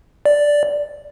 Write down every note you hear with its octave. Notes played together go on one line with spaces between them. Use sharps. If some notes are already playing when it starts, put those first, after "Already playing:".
D5